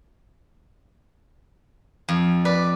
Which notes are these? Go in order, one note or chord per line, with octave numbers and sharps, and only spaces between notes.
F2
B4 D5